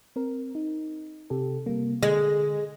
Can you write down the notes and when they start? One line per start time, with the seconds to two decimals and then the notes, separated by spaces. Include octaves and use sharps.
0.16 C4 A#4
0.55 D#4
1.30 C3 G4 A4
1.66 C3 G3 A#3
2.03 D3 G#3